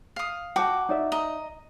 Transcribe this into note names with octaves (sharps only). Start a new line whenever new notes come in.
F5 D#6
F#4 G5 A5 D6
D#4 D5 E5
D#5 A#5